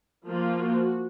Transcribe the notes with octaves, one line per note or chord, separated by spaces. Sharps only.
F3 A#3 F4
F#4